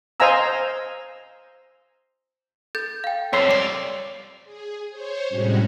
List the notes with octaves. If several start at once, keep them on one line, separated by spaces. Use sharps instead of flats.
C5 D#5 F5 G#5 A#5 E6
A4 G6 A6
F5 G5
F2 F3 C#5 C6 E6 B6
C2 D5 D6 C7
G#4
C5 C#5
A2 C3 G3 G#3 C#4 F#4